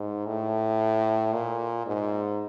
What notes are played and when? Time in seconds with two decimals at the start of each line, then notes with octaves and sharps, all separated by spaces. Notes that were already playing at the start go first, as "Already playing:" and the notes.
Already playing: G#2
0.26 A2
1.34 A#2
1.87 G#2